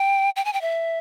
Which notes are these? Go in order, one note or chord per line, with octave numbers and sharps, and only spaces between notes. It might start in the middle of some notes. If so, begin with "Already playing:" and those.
Already playing: G5
G5
G#5
G5
E5